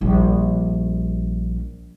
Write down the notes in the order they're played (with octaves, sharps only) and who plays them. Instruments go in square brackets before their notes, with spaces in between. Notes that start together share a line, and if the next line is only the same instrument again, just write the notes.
[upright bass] A#1 G3